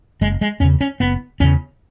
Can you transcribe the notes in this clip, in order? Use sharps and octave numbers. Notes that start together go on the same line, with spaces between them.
F#1 G#3
G#3
E2 C#3 C#4
C#4
F#1 B3
E2 C#3 C#4